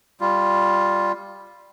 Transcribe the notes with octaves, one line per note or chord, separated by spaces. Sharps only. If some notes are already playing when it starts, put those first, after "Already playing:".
G3 F4